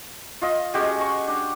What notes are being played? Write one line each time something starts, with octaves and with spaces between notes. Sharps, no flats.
F4 D#5
G#3 C#4 F#4 G4
C#6
D4